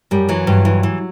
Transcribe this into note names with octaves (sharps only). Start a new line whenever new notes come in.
F#2 G3
E3 F#3
G2
E3
E3